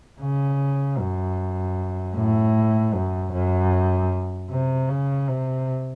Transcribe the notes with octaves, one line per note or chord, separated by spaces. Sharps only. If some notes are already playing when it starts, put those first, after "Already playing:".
C#3
F#2
A2
F#2
F#2
C3
C#3
C3